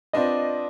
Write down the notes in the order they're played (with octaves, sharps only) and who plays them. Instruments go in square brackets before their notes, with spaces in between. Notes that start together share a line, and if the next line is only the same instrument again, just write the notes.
[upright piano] C4 F4 B4 D#5 [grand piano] D4